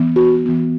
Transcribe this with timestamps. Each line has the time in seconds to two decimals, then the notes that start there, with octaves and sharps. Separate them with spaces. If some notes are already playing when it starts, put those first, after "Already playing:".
Already playing: E3 B3
0.16 F#4
0.46 E3 B3